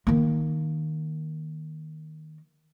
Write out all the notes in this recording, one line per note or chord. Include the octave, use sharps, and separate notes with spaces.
D#3 A#3